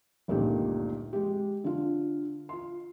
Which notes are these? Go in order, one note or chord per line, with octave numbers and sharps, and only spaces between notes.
G1 C#2 A#2 D#3 A3 G4
G#3 G4
D3 F4
F4 C6